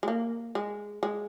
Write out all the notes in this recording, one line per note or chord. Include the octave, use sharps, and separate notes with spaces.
G#3
A#3
G#3
G#3